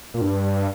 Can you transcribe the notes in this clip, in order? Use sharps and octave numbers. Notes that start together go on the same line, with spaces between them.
A#2
G2